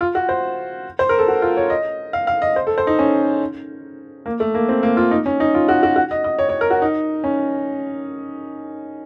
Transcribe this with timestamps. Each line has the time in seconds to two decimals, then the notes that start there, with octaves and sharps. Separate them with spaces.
0.01 F4
0.15 F#4
0.29 C5
0.99 C5
1.09 A#4
1.18 A4
1.28 F#4
1.42 F4
1.57 C#5
1.70 D#5
2.13 F5
2.27 F5
2.42 D#5
2.56 C5
2.67 A4
2.78 C5
2.87 D#4
2.99 C#4
4.26 A#3
4.40 A3
4.54 A#3
4.69 C4
4.83 A#3
4.97 F4
5.11 D#4
5.26 C#4
5.40 D#4
5.54 F4
5.68 F#4
5.83 F#4
5.96 F#4
6.11 D#5
6.24 D#5
6.39 C#5
6.49 C#5
6.61 A#4
6.70 F#4
6.82 D#4
7.24 C#4